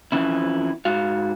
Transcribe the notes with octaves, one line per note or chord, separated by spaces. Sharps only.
F2 E3 F3 C#4 E4
G#2 F#4 F5